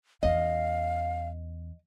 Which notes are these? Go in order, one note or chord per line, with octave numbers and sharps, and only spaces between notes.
E2 C#4 D#5 F5